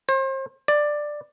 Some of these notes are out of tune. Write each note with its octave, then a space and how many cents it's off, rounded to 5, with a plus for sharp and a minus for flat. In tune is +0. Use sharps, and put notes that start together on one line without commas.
C5 +35
D5 +10